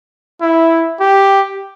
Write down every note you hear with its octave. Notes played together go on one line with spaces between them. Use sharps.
E4
G4